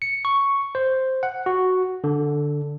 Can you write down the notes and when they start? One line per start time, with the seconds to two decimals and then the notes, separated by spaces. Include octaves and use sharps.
0.02 C#7
0.25 C#6
0.75 C5
1.23 F#5
1.46 F#4
2.04 D3